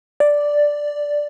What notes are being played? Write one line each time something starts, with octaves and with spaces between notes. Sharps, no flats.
D5